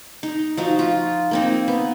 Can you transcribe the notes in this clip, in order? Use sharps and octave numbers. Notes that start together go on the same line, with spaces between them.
D#4
F3 D#4 F#4
F4
A#3 C4 D#4
B3